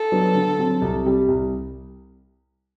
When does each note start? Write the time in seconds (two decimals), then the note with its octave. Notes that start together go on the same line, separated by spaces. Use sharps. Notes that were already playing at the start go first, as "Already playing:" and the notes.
Already playing: A4
0.12 F#3 B3 D4
0.34 D3
0.58 F#3 C4
0.81 C2
1.05 C3 G3
1.28 C2